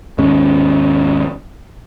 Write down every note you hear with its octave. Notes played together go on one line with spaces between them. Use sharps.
D#2 G#2 G#3 C#4